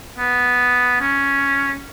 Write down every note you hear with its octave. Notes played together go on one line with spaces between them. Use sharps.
B3
C#4